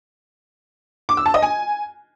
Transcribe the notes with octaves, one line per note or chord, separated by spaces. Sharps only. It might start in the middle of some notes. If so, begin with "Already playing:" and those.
D6
E6
A5
D#5
G#5